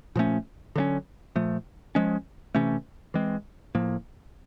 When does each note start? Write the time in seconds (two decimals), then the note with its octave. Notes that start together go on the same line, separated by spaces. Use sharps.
0.16 A#2 F3 A3 C#4
0.76 D3 F#3 A3 C#4
1.36 A#2 F3 A3
1.95 F3 G#3 C#4
2.55 C3 E3 A3 C#4
3.14 E3 G#3 C4
3.75 A2 F3 A#3